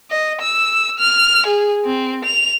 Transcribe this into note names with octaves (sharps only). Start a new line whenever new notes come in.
D#5
E6
F6
G#4
C4
F7